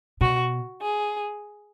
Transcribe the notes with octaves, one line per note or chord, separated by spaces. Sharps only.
B2 F#4
G#4